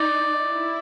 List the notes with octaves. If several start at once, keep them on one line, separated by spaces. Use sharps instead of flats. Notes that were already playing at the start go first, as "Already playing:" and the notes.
Already playing: D#4 D5
E4